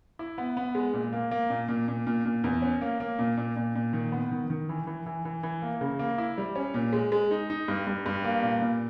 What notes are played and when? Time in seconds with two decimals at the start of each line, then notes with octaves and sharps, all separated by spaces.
0.19 E4
0.38 B3
0.57 B3
0.75 G#3
0.94 A#2
1.13 A#3
1.31 A#3
1.50 A#2
1.68 A#2
1.88 A#2
2.07 A#2
2.25 A#2
2.44 E2
2.62 C#4
2.81 A#3
3.00 A#3
3.19 A#2
3.37 A#2
3.56 A#2
3.75 A#2
3.93 D#3
4.12 B3
4.31 D#3
4.50 D#3
4.69 E3
4.87 E3
5.06 E3
5.25 E3
5.43 E3
5.62 A#3
5.81 C#3
5.99 A#3
6.18 E4
6.38 G3
6.56 C#4
6.74 A#2
6.93 G#3
7.12 G#3
7.31 D#4
7.50 D#4
7.68 G2
7.87 G2
8.06 G2
8.24 A#3
8.42 A#2
8.62 A#2